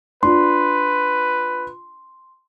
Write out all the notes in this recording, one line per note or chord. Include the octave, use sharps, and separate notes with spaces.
D4 F4 B4 C6